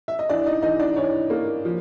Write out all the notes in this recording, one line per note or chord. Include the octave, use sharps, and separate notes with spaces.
E5
D#5
E3 D4 D5
D#4 D#5
E3 D#4 D#5
D4 D5
E3 C#5
A#3
F3